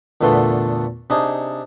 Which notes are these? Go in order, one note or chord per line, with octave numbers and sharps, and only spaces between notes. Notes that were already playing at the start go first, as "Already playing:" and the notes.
E2 A#2 D3 A3 B3 C6
C3 D4 D#4 G#4